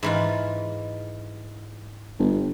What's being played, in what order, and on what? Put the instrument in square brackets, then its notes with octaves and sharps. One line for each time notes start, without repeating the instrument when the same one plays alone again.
[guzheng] G#2 E3 F4
[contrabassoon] G1